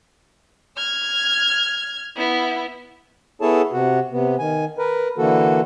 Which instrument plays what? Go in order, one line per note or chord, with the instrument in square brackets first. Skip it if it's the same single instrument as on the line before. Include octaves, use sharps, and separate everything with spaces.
[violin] F6 G#6
B3 E4
[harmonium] B3 E4 G#4 A4 C#5 A5
C3 F#4
C3 B3
D#3 G#5
A#4 B4
D3 E3 A#3 F#4 A4